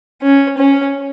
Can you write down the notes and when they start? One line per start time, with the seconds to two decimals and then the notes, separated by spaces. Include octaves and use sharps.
0.21 C#4
0.57 C#4